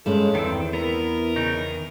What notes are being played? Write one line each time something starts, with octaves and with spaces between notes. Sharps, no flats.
G2 G#3 C#4 A4
E2 D#3 C4 E6
B3 E4 A#4
C#3 D#4
D#3